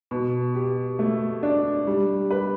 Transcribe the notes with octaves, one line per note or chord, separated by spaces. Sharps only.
B2
G4
A3
D4
G3
B4